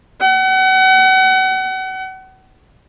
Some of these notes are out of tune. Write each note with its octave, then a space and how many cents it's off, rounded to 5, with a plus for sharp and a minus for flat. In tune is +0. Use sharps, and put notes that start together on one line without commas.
F#5 +35